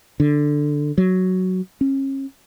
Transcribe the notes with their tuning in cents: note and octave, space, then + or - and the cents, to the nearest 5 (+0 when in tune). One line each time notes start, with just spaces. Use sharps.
D3 +5
F#3 +5
C#4 -35